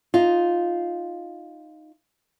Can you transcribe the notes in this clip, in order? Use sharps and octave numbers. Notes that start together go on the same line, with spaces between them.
D#4 F4